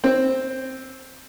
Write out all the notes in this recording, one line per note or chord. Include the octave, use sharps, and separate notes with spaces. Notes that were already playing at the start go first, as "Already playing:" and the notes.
C4